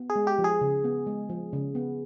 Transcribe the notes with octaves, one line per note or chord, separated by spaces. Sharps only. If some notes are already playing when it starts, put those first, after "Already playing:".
Already playing: B3
G#4
G#3
G4
F3
G#4
C#3
B3
G#3
F3
C#3
B3